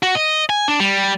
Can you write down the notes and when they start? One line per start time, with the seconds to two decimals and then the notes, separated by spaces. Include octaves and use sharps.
0.03 F#4
0.15 D#5
0.50 G#5
0.68 D4
0.80 G3